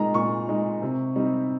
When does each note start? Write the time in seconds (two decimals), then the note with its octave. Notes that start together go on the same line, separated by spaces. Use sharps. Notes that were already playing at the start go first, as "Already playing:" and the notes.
Already playing: A#2 G#3 D#4 A#5
0.14 A#2 C#6
0.49 G#3 D#4
0.82 C3
1.16 G3 C4 D#4